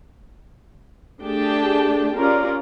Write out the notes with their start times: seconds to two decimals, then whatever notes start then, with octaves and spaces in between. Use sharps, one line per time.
1.22 A3 D4 G4 G#4 G5 A5
2.17 C#4 F4 G4 A#4 D5